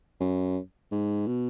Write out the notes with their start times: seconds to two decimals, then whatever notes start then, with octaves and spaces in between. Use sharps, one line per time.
0.20 F#2
0.92 G#2
1.27 B2